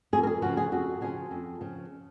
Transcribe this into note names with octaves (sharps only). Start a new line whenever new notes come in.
F2 G#4
A#4
G#4
C#3 F3 F#4
G#4
F2 F#4
C#3 F3 G#4
F2
C#3 F3